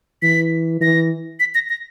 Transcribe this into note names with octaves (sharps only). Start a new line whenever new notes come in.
E3 B6
E3 A#6
B6
A#6
A#6